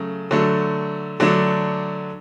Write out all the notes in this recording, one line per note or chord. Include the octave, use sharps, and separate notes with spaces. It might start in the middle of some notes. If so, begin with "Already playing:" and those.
Already playing: C#3 F#3 A3
D3 F#3 A3
D3 F#3 A3 D4